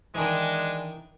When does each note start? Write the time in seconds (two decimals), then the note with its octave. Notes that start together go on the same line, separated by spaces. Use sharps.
0.15 D#3 E3 G#3 D4